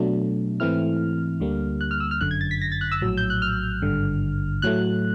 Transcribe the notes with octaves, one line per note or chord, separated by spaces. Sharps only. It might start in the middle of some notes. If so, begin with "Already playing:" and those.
Already playing: B2 F#3 A3 D4
G#2 E3 A3 C4 E4 F6
D2 D3 G3 A#3
F#6
F6
E6
F6
G1 F#2 D3 F#6
G#6
A6
B6
A#6
A6
F#6
E6
A#1 A2 F#3
G6
F#6
F6
G#1 G2 D3
A2 F#3 A3 F#6